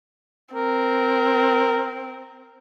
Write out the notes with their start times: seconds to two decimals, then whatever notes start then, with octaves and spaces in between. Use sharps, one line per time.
0.55 C4 A#4